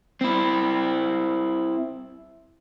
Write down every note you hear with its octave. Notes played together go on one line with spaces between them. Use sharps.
C4 E4